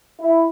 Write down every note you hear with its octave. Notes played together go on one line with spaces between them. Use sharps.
E4